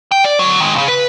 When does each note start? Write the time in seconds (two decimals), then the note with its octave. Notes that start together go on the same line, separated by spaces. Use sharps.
0.12 G5
0.24 D5
0.39 D3 F#3
0.60 D#3 G#3
0.75 C#2 C#3
0.88 B4